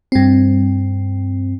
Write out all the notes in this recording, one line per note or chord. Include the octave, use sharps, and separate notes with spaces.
G2 C4